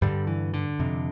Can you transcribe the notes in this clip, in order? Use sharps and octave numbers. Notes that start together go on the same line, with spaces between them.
G2 D3 G3
E3
D3
F2 C3